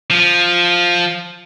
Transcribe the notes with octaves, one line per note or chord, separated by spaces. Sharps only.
F3